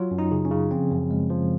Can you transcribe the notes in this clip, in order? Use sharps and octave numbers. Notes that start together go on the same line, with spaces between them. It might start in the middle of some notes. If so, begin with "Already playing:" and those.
Already playing: F#3 F4
F#2
D#4
C#3
C#4
C#3
F3 C4
F#2
G#3
F3